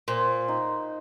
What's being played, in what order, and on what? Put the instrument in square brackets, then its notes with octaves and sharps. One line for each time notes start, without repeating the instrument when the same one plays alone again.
[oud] A#2 [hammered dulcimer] C5
[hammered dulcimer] D#4